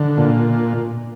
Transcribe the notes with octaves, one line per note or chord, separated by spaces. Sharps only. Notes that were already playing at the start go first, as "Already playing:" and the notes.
Already playing: D3
A#2